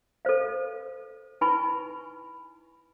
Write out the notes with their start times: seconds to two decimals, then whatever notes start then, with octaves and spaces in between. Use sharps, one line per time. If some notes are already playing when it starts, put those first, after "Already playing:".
0.25 A4 B4 C5 F5
1.41 D#4 E4 B4 G#5 B5 C#6